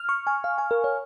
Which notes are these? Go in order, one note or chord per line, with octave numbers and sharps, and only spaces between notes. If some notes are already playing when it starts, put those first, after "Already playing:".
Already playing: F6
C#6
G#5
F5
G#5
A#4
C#5